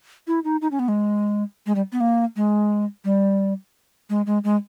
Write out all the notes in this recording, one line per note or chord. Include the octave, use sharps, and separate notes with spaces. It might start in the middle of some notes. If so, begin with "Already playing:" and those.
E4
D#4
D#4
C#4
B3
G#3
G#3
G3
B3
A#3
G#3
G3
G#3
G#3
G#3